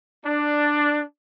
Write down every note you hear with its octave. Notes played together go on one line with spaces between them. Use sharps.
D4